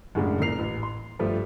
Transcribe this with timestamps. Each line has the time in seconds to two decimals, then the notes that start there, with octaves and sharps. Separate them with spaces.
0.15 F#2 A2 C#3 G#3 D4
0.40 F#1 A#2 A#4 C7 F7
0.59 A1
0.83 C6
1.19 G2 F3 G3 A3